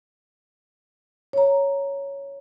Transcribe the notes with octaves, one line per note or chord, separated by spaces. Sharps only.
C#5 A#5